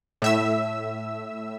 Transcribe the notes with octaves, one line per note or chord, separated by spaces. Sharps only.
A2 E5 E6